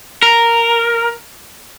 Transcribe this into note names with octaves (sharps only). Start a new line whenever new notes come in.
A#4